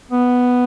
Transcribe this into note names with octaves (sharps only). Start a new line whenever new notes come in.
B3